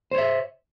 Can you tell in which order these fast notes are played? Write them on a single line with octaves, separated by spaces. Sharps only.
C5 C#5 E5